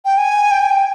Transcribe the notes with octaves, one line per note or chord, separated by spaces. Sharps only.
G5
G#5
G5
G#5
G5